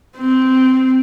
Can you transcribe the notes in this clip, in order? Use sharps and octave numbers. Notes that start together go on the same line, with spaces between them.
C4